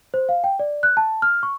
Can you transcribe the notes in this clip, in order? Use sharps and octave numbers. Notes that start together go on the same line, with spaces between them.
C5
F5
G5
D5
F#6
A5
F6
C#6